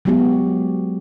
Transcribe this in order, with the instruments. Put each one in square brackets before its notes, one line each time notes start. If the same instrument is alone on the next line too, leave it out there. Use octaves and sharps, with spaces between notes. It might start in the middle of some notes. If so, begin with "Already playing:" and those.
[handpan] F#3 G#3 B3 F#4 G4